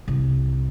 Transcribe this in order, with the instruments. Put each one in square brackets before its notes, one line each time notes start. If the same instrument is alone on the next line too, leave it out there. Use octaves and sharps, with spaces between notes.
[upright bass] C2